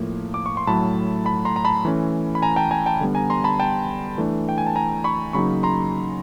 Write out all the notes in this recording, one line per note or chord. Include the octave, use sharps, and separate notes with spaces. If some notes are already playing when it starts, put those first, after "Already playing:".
Already playing: A2 F3 A#3
D6
C#6
C6
A2 F#3 A3 A5 B5
A5 B5
A#5 C6
A#5
A5 B5
E3 A3 C#4
B5
G#5 A#5
G5 A5
G#5 A#5
G5 A5
D3 G3 B3
G#5 A#5
A#5 C6
A5 B5
G5 A5
E3 A3 D4
G5
G#5
A5
G#5 A#5
B5 C#6
C#3 F#3 A#3 D#4 B5 C#6
A#5 C6